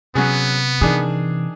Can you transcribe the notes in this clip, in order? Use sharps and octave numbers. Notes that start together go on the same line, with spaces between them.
C3 F#3 B3 C#4 G#4
D#3 E3 D4 G#4